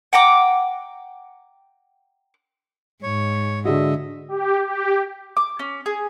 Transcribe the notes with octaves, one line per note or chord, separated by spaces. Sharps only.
F#5 G5 A#5 D6
G#2 C#5
D3 G#3 F#4 D#5 E5
G4
G4
D6
C#4
G#4